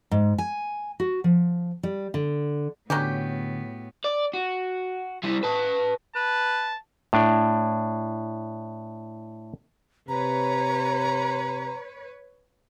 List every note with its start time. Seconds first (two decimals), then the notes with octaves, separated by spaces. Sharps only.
0.11 G#2
0.38 G#5
1.00 F#4
1.24 F3
1.83 G3
2.14 D3
2.90 A2 D3 F#3 B3 C#4 G4
4.04 D5
4.33 F#4
5.24 G3 E4
5.43 B4 A5
6.15 B4 A5
7.13 A2 D4
10.09 C3 B4 C#5 A#5